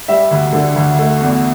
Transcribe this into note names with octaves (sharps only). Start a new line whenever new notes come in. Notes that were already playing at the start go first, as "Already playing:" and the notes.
G3 E5
D2
D3
D2
A3
E2